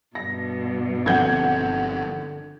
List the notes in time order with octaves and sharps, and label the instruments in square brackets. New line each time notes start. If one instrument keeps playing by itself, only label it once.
[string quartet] G2 B2 [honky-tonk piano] A#6
[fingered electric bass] G1 F3 C4 [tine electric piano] D3 [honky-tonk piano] F#5 G6 G#6